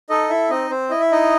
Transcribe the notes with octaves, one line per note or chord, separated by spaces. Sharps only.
D#4 A4 D#5
E4 E5
C4 D#4 D#5
C4 C5
E4 D#5
E5
D#4 D#5